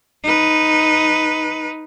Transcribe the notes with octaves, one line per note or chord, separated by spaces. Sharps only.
D#4 B4